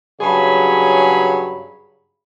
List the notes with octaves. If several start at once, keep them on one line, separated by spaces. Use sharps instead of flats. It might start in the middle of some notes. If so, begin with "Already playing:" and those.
G2 C#3 F#3 G#4 C#5 B5